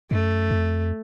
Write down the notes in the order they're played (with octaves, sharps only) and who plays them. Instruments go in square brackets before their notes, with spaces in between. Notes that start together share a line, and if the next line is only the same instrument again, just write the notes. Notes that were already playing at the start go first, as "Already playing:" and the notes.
[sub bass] F#2 [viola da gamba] A3
[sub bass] F2